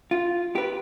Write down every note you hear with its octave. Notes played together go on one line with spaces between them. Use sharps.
F4
G4 B4